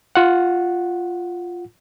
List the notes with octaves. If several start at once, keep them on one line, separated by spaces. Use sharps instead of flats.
F4 F#5